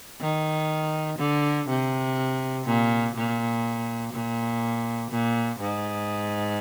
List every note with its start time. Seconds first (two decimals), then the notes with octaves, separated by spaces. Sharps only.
0.21 D#3
1.19 D3
1.68 C3
2.66 A#2
3.16 A#2
4.13 A#2
5.11 A#2
5.60 G#2